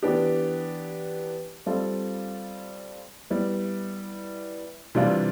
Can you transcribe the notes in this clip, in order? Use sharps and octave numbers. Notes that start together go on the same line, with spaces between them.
E3 B3 D4 G4
G3 C4 F4 A4
G3 B3 E4
C3 E3 G3 D4 F4